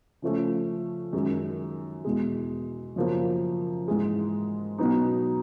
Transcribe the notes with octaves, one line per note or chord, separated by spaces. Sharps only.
C#3 F3 A3 C#4
F#2 D#3 G#3
E2 B2 G#3
F#2 C#3 F3 A#3
G#2 E3 G#3
B2 F#3 B3 D#4